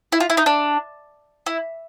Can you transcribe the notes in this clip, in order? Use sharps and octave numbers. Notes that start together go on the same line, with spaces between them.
E4
F4
E4
D#4
D4
E4